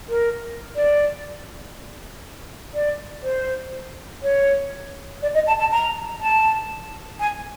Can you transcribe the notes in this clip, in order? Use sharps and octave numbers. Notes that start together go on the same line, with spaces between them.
A#4
D5
D5
C5
C#5
D5
D#5
A5
A5
A#5
A5
G#5